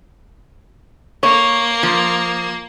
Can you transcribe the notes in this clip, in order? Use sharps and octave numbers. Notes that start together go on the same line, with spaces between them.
A#3 C#5
F3